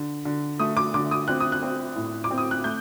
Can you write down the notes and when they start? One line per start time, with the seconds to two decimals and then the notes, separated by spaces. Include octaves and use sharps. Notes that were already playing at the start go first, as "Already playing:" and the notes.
Already playing: D3
0.25 D3
0.59 A3 D#6
0.77 D6
0.94 D3 D6
1.11 D#6
1.28 C4 F#6
1.40 D#6
1.52 F#6
1.63 C4
1.96 A2
2.24 D6
2.31 C4
2.38 D#6
2.51 F#6
2.64 A3 G6